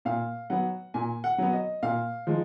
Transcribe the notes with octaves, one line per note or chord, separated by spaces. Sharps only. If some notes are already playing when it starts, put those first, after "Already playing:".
A#2 F5
F#3 B3 F#5
A#2 G#5
F#5
F#3 B3
D#5
A#2 F5
F3 G#3 D#4